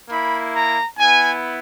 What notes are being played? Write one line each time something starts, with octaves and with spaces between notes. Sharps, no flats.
A#3 E4 B5
A#5
B3 E4 G#5